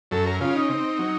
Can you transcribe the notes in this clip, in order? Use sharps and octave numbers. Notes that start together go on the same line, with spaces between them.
F#2 A4
A#4
C#3 F4
D#4
C4
F#3